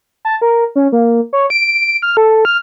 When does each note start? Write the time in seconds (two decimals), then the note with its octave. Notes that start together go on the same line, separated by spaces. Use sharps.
0.25 A5
0.42 A#4
0.76 C#4
0.92 A#3
1.33 C#5
1.50 D7
2.02 F6
2.17 A4
2.45 F6